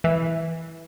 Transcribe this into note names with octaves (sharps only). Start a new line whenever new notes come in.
E3